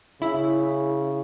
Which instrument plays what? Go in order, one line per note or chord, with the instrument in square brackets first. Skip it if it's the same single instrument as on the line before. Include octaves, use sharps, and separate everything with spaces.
[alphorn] C#3 [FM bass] E4